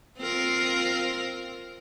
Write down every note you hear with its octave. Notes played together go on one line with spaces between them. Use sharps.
C4 F4 A#4